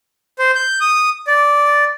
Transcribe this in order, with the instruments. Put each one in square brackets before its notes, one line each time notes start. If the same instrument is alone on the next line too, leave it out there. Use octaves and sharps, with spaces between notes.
[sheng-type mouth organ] C5
G6
D#6
D5